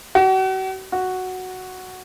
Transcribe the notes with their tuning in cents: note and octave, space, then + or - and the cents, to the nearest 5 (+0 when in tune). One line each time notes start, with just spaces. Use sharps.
F#4 +40
F#4 +0